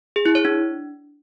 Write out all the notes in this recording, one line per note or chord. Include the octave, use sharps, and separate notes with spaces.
G#4
E4
C#5
D4